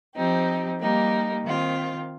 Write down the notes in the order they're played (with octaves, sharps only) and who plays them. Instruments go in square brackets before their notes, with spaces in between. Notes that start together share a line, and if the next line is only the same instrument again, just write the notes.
[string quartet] F3 C4 D#4 G4
G3 A#3 D#4 G4
D#3 C4 F4